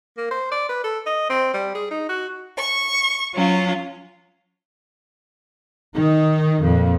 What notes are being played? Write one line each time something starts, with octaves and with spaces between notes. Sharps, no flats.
A#3
C5
D5
B4
A4
D#5
C4
G3
G#4
D#4
F#4
C#6
F#3 C#4 F4
D#3 D#4
F2 A#2